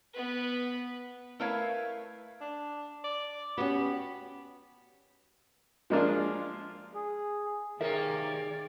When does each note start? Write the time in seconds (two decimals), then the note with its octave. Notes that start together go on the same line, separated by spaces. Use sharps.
0.14 B3 B4
1.40 A3 E4 A#4 B4 C#5 F5
2.41 D4
3.04 D5
3.57 B3 C#4 F#4 G4
5.90 F3 G#3 A#3 D4 F4
6.95 G#4
7.81 C3 D#3 A#3 C#4 G#4 A#4 D5 E5